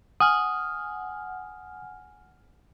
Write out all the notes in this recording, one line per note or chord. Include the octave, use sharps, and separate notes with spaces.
F#5 G#5 D#6 F6